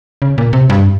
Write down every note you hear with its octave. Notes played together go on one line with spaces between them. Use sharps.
C#3
A#2
C3
G2